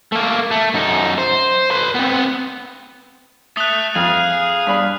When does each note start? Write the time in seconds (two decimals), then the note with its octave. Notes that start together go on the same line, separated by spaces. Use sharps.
0.12 A3 A#3
0.51 A3
0.74 F#2 D#4
1.18 C5
1.71 B4 C6
1.95 B3 C4
3.57 A3 D#6 F#6
3.95 F2 G#4 F5 F6
4.67 G2 D4 B5